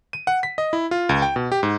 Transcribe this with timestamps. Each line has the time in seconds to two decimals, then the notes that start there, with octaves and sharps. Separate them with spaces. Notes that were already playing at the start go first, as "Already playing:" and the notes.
0.13 D#7
0.27 F#5
0.43 B6
0.58 D#5
0.73 E4
0.91 F4
1.09 C#2
1.22 G5
1.36 B2
1.52 G4
1.63 G#2